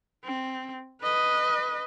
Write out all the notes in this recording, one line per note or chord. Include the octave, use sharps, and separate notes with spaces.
C4
B4 D#5